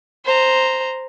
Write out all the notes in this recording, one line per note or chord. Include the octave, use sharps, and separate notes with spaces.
C5 A#5